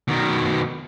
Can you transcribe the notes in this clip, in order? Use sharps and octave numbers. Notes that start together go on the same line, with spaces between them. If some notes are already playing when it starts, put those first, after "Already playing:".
B2 D#3